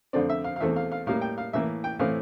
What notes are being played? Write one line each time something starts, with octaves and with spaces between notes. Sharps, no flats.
F2 D3 A3 C4 D5
E5
F5
F5
E2 E3 A3 C4 E5
F5
F5
A2 G3 A#3 F5
G5
F5
A2 E3 A#3 E5
G5
A2 E3 A3 C4 F5